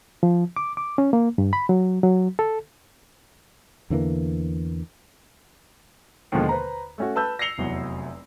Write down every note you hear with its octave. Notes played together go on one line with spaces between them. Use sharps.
F3
D6
D6
C#4
A#3
G2
B5
F#3
F#3
A4
E2 D3 E3 A#3
D#2 B2 D3 F3 G#3
B4 C5 A#5
A3 C#4 F#4
B4 A5 E6 G6
A#6 C7 C#7 F7 G7
F1 E2 F#3